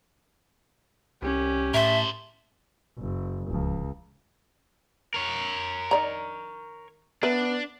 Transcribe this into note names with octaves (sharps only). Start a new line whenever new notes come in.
C2 C#4 G4
A2 A#4 C5 E5 A5
F#1
D1 C#2 F3
A#4 C#5
D#3 D5 A#5
B3 D4 A#4 B4 E5